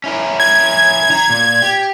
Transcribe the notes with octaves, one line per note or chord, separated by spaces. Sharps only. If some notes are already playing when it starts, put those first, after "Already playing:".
C#4 E4 A#4
G#6
D#3 A#5
A#2
G4